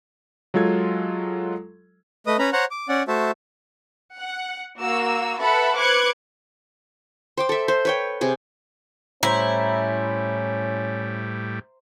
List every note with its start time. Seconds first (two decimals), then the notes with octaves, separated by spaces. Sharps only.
0.54 F#3 G#3 F4 A4 G#6
2.27 A3 B4 D#5 D#6
2.39 C#4 B4 A#5 B5
2.53 C5 C#5 F#5 A#5 F#6
2.71 D6
2.89 C#4 D5 F#5
3.08 A3 F#4 C5 E5 A5
4.18 F#5
4.80 A#3 F#4 E6
5.41 A4 B4 E5 F#5 A5 B5
5.75 B4 C5 D6 F#6 G#6 C#7
7.37 C5 G5 D6
7.49 A4 E5
7.68 C5
7.85 B4 C#5 G5
8.21 C3 G#4
9.23 A2 G3 C#4 E4 C5 A#5